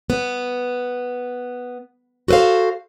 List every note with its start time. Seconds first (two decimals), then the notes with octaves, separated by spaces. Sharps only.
0.10 B3
2.28 F#4 A4 B4 C5 F5